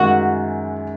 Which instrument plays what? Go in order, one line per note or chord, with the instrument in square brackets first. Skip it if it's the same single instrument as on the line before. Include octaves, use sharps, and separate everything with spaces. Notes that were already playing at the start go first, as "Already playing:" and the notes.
Already playing: [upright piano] F#2 D#3 G#3 [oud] F#4